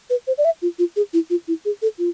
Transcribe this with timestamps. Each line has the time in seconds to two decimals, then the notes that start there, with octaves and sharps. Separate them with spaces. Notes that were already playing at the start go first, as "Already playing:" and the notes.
0.10 B4
0.27 C5
0.38 D5
0.45 E5
0.62 F4
0.79 F4
0.96 G#4
1.13 E4
1.30 F4
1.48 E4
1.65 G#4
1.82 A4
1.99 F4